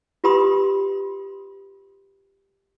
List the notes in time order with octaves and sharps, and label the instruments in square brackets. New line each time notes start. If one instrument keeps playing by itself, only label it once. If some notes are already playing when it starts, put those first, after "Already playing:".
[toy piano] F4 G4 B4 B5 C6 D#6